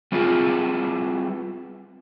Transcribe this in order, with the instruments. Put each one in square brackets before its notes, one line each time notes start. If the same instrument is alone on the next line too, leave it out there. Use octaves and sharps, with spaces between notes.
[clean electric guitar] G3 B3 C4 E4 F4 G#4